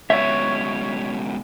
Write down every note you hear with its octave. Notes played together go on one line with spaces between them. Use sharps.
C#2 B2 C#5 E5